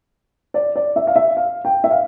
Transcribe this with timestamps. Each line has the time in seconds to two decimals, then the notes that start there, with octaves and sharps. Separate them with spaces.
0.54 D5
0.76 D5
0.96 E5
1.07 F5
1.16 E5
1.37 F5
1.65 G5
1.84 E5
1.91 F5